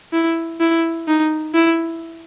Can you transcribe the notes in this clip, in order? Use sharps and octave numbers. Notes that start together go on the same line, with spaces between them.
E4
E4
D#4
E4